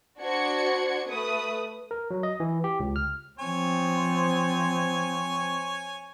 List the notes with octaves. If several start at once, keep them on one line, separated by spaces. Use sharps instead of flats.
D4 F#4 C5 G#6 C#7
A3 B4 D#6
A#4
F#3
D#5
E3
G4
C#2
F6
F3 C4 C#5 G#5